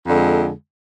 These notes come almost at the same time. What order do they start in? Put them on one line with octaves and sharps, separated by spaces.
F2 D3 G#3